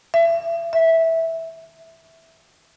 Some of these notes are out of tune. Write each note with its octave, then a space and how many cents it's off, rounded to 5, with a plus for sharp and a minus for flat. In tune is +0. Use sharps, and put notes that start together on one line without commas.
E5 +35
E5 -10